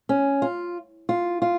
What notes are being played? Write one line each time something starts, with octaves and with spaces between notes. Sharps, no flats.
C#4
F4
F4
F4